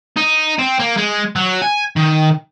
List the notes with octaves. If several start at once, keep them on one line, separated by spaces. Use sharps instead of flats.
D#4
C4
A#3
G#3
F#3
G#5
D#3